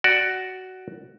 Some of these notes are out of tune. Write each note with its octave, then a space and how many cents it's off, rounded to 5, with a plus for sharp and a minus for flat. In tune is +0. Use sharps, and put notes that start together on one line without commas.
F#4 +15 D5 +5